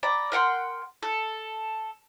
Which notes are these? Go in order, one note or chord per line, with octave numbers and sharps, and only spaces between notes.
D5 G5 A#5 B5
A#4 F#5 G5 C6
A4